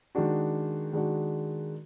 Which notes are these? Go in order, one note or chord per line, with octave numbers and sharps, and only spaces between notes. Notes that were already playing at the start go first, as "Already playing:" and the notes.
D#3 G#3 D4 F#4
D#3 G#3 D4 F#4